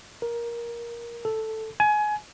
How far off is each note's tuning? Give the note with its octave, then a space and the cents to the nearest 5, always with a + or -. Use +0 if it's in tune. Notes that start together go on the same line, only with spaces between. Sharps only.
A#4 +15
A4 +0
G#5 +25